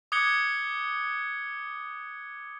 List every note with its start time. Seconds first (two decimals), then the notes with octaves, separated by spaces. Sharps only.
0.12 D6 D#6 F#6 G#6 C#7 G7